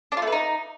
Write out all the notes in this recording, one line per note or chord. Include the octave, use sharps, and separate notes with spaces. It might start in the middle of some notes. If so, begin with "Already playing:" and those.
D4
F4
A3
B4
D#4